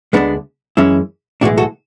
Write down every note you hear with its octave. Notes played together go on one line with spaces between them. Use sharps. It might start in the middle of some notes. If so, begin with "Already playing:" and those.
D2 D3 G#3 B3 D4
F#2 E3 G#3 C#4 E4
B1 A2 E3 G#3 D4 F#4
F#4 A4